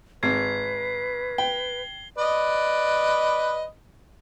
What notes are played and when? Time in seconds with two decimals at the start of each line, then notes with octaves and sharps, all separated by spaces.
0.23 G#1 B4 G#6 C7
1.38 G5 G7
2.18 B4 D5 D#5